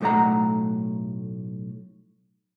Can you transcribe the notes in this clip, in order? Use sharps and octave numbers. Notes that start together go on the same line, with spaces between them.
B1 A2 A3 D5 F#5 A#5